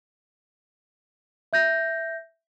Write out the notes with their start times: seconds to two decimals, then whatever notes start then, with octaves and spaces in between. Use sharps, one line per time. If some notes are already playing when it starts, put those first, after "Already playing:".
1.53 E5 G6 A#6